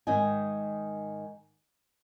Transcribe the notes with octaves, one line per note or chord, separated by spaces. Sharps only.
G#2 D#3 D#5 G#5